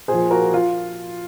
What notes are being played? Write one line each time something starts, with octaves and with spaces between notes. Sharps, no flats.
A#2 G#4 C5
F3
F#4 A#4
F3 F4